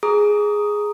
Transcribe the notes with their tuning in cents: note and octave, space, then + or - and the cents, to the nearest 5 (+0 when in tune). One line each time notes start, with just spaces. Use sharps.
G#4 +0 A#5 +0 D#6 +0